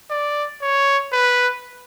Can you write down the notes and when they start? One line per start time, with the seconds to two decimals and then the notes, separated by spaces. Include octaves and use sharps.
0.11 D5
0.62 C#5
1.13 B4